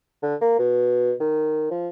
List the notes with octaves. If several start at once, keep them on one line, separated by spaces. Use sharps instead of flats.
D3
A#3
B2
D#3
F3